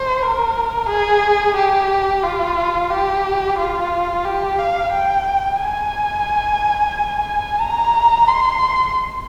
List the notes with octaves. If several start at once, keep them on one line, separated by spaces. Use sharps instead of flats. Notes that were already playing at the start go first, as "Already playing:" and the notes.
Already playing: C5
A#4
G#4
G4
F4
G4
F4
G4
F5
G5
G#5
A#5
C6